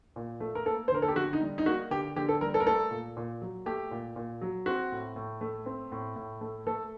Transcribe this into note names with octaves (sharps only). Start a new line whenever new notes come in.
A#2
A3
A#4
A#3 A4
C5
D3 A#4
A4
G4
D3 F#4
D#4
G3
D#4
A#3 F#4
D3 G4
D3 G4
A4
G3 A#4
A4
A#4
A3 A4
A#2
A#2
F#3
A3 G4
A#2
A#2
F#3
C4 F#4
A2
A2
A3
C4
A2
A2
A3
A3 A4